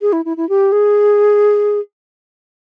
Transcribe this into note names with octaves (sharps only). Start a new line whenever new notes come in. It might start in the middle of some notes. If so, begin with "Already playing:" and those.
G#4
E4
E4
E4
G4
G#4